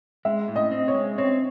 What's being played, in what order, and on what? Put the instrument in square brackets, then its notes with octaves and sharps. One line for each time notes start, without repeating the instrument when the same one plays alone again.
[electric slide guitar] G#3 [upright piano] E5
[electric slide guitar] A2
[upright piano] D#5
[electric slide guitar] C4
[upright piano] C#5
[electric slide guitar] G#3
[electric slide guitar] C4 [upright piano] C#5